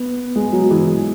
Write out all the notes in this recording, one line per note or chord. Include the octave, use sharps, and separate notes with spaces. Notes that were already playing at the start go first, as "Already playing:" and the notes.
Already playing: B3
G#3
F#3
E3